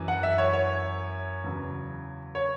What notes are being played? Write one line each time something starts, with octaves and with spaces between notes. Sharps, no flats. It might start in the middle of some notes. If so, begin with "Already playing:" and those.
Already playing: F#2 E3
F#5
E5
C#5
C#5
E2 C#3 F#3
C#5